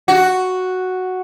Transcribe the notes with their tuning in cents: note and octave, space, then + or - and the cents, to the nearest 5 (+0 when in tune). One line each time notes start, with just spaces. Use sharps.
F#4 +0